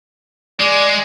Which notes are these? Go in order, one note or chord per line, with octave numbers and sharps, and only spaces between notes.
G#3 D5